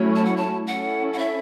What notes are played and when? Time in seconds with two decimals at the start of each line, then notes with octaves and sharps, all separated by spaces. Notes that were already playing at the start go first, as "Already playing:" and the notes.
Already playing: F#3 A3 C#4 E4 C#5
0.16 A5
0.25 F#5
0.37 A5
0.66 C#4 E4 A4 F#5
1.13 F#5
1.19 E5